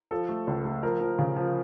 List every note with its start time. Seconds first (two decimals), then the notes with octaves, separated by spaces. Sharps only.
0.11 F3 A4
0.29 A3
0.47 C#2
0.65 A3
0.83 F3 A#4
1.01 F3
1.19 C#3
1.36 F3